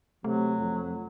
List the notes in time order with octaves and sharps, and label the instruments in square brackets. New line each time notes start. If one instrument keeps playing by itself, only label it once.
[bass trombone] C3 [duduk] F#3 [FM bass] A3
[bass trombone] F2